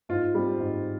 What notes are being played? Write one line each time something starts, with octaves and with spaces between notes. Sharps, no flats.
G#2 F4
G3 C4
G#2